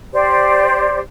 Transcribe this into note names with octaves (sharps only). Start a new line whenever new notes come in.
G4 C5 D5